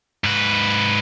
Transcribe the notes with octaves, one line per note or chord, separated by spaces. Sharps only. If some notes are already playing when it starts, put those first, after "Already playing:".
G#2 B4